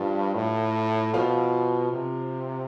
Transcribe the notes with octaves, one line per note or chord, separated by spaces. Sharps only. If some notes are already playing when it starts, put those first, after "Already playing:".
Already playing: G2 F3 F4
A2
B2 F3 F4
C3